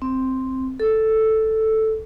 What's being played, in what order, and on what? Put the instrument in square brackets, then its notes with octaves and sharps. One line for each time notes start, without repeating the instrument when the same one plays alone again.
[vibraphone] C4
A4